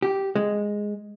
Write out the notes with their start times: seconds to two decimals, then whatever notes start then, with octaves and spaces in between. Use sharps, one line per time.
0.02 G4
0.35 G#3